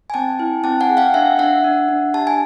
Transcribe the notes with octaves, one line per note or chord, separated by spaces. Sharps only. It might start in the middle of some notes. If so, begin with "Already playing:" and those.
G#5
C4 G5 A5
E4
C4 G5 A5
F#5 G#5
G#4
F5 G5
D4 E5 F#5
D4 E5 F#5
D4
D4
G4 A5
G#5